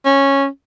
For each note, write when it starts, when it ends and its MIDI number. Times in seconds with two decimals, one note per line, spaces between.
0.05 0.46 61